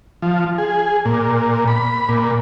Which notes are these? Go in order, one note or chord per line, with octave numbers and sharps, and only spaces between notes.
F3
G#4
A#2
B5
A#2